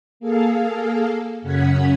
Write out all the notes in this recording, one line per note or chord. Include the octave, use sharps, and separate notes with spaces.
A#3 G#4 A4 F5
F#2 C#3 C#4 F#5 G#6 B6